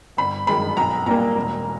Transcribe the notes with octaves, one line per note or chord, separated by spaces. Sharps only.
G1 B5
F#2 D#3 G#3 B5
B1 A#5
A#2 G3 A#3 A#5
E1